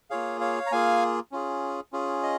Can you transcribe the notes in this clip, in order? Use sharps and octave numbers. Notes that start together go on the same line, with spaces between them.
A#3 F4 G#4 C#5 F5
C#5 F5
A#5
A#3 F4 G#4 F5 G#5
C#4 F4 G#4
C#4 F4 G#4
D#5